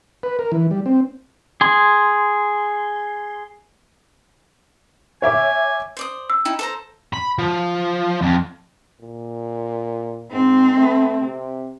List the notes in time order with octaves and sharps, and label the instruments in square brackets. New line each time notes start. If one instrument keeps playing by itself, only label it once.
[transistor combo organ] B4
A#4
E3
G3
C4
[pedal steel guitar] G#4 C6
[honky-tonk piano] C#5 E5 D6 [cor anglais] G#5
[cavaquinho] C5 D5 D#6
[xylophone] E6
[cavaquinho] D#4 E4 G5
A4 C5 A#5
[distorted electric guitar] B5
F3
F2
[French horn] A#2
[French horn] G#2 [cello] C4
[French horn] A3
C3